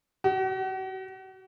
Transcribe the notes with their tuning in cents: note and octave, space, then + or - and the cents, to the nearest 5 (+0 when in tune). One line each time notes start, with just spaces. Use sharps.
F#4 +40